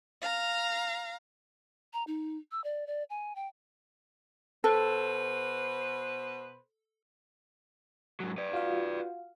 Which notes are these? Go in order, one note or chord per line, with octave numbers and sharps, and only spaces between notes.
F5 A#5
A#5
D#4
E6
D5
D5
G#5
G5
B2 A4 B4 C5
G#2 F#3
B4 D5
F4 F#4 F5